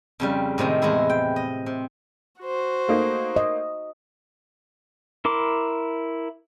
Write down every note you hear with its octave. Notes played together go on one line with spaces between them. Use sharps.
F2 C#3 G3
A2 C3 D#3 G#3
E2 A2 G#3 E4 G#4
G5
D#5
C3
F#4 C5
A3 A#3 D#4
D#5
E4 A#4 C6 D6